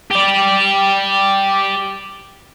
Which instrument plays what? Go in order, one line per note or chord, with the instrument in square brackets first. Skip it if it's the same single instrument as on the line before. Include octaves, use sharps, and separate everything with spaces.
[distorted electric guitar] G4 D5